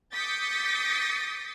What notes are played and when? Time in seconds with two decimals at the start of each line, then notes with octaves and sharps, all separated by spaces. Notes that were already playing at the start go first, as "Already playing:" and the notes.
0.13 D6 D#6 G6 A6 B6 C#7